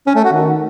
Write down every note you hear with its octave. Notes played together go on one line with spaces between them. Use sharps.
C#4
A3
F#4
D#3